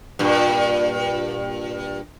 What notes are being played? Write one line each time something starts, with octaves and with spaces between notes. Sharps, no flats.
G2 A#2